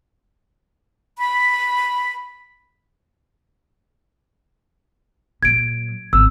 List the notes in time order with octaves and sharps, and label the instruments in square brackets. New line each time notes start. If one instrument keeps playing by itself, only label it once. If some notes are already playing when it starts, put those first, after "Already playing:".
[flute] B5
[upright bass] A#2 F#3 [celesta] G#6 D7
[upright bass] G#1 [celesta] E6